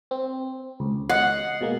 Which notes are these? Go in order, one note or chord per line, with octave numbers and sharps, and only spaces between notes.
C4
C#2
D#5 F#5 C7
B2 G#3 A#3